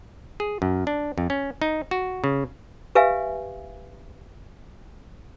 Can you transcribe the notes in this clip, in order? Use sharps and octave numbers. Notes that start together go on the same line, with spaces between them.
G#4
F#2
D4
F2
C#4
D#4
F#4
C#3
G4 B4 E5 F5 G#5